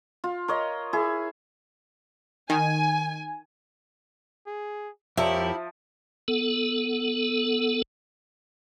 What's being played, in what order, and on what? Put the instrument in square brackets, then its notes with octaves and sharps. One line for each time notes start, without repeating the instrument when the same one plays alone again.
[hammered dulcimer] F4
A#4 C#5 D#5
E4 G#4
[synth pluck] D#3 [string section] G#5
[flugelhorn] G#4
[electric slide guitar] F2 A#4 C#5 [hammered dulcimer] F3 [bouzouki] E4 [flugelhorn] G4
[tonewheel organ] B3 A4